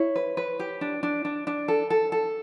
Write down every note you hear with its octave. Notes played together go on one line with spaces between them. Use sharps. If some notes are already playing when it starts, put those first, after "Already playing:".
Already playing: E4 C#5
B4
B4
G4
D4
D4
D4
D4
A4
A4
A4